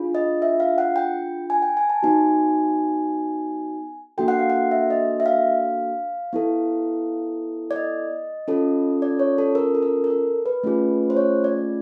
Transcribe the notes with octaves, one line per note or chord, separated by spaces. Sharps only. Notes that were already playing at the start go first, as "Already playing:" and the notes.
Already playing: D4 F4 G#4
D#5
E5
F5
F#5
G5
G#5
G5
G#5
A5
B3 D#4 F#4 G#5
A#3 D4 F#4 A4 G5
F#5
F5
F#5
E5
D#5
E5
F5
B3 E4 A4
D5
D#5
C#4 F4 A4
D5
C#5
A4
A#4
A4
A#4
A#4
A4
B4
A3 C#4 F4 G#4
C5
C#5
D5